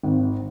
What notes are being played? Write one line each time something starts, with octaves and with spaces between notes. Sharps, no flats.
G#1